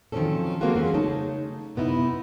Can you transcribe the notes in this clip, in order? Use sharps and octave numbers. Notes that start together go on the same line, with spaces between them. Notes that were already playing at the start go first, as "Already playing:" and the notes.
D#3 F3 F#3 C4 C#4 A4
G#3 A#3 C4 F4 F#4 A4
E3 F#3 C#4 G#4
C#3 A3 D#4 C#5 A5
F#2 C3 B3 D#4 E4